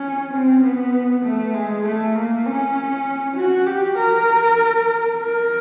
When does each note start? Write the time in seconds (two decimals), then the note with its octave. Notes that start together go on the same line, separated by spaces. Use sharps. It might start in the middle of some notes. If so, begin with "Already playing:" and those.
Already playing: C#4
0.33 C4
0.63 B3
1.25 A3
1.54 G#3
1.85 A3
2.15 A#3
2.45 C#4
3.37 F#4
3.66 G4
3.97 A#4
5.18 A#4